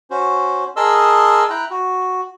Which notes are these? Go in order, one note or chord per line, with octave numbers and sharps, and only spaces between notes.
C#4 F#4 C5
G#4 A#4 D#5 A5 C6 E6
E4 G5 A#5 F#6
F#4